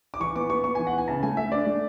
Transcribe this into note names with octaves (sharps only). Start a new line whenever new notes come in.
D6
E3 C#6
B3 D6
B3 C#6
B3 C#6
E3 G#5
F#5
B3 G#5
C#3 A5
A3 G#5
A3 E5
D4 D5
A3